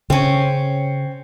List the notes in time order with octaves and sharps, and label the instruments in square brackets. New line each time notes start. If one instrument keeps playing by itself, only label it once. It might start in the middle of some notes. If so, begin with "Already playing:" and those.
[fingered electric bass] C#3 [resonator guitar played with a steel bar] C4 C#4